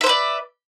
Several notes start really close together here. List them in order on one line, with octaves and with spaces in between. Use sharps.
E5 C5 B4 D5